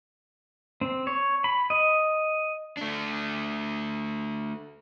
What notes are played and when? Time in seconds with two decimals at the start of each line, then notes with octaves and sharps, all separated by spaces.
0.81 C4
1.07 C#5
1.44 B5
1.70 D#5
2.77 A3 D4